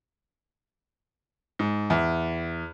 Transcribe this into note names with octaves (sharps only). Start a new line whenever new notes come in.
G#2
E2